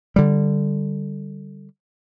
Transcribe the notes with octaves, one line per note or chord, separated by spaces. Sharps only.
D3 G3